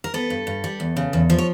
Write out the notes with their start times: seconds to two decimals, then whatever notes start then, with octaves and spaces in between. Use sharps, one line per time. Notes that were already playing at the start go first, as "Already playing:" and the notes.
0.04 A#4
0.14 B3 A4 B4
0.30 G2
0.47 G2
0.64 G3
0.80 E2
0.97 C#3
1.13 E2
1.30 F3
1.38 C#5